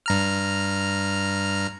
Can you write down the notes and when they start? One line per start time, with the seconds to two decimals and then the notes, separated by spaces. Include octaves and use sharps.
0.06 G2 A#5 F6